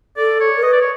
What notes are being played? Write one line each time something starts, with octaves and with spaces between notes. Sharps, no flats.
A4 D5
C#5
A#4
B4 D#5
D5
C#5